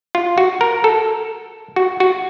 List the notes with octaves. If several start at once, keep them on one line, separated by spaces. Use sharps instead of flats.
F4
F#4
A#4
A4
F#4
F#4